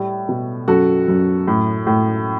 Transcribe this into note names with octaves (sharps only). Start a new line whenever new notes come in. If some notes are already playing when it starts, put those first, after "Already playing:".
Already playing: A2 G3
B2
F#2 F#4 A4
F#2
A2
A2